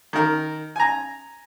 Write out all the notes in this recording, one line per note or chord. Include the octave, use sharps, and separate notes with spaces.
D#3 A#4
G#5 A#5